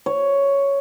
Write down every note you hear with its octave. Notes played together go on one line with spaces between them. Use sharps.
C#5